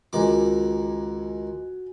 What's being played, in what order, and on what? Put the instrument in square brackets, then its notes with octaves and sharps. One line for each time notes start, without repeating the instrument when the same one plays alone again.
[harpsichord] C#2 D#3 D6 [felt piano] F#4 G#5